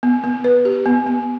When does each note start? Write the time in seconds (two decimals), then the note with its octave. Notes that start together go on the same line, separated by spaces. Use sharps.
0.03 B3
0.24 B3
0.44 B4
0.65 G4
0.86 B3
1.06 B3